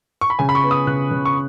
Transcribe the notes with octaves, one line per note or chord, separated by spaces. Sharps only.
C#6
B5
C#3 G#5
B5
C#6
B3
D#6
C#3 F#6
C#3
C#6